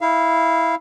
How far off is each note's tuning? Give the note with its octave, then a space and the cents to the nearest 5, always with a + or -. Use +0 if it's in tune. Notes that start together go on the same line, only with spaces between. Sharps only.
E4 -10 F5 -20